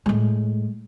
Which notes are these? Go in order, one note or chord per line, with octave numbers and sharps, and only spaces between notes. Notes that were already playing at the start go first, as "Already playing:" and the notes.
A2 G#3